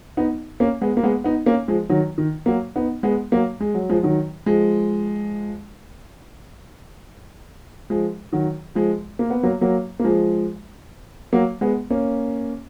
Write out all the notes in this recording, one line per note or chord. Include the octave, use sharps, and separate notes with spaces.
B3 D#4
A#3 C#4
G#3 B3
A#3
G#3 B3
B3 D#4
A#3 C#4
F3 G#3
D#3 F#3
D#3
F#3 A#3
B3 D#4
G#3 B3
F#3 A#3
G#3
F#3
F3 G#3
D#3 F#3
F3 G#3
F3 G#3
D#3 F#3
F3 G#3
A#3
B3
F#3 A#3
F#3 A#3
A#3
F3 G#3
F#3 A#3
G#3 B3
A#3 C#4